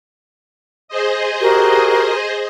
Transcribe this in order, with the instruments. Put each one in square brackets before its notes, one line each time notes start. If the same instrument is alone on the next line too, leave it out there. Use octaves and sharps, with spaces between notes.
[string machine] G#4 C5 D#5
[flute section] F#4 G4 A#4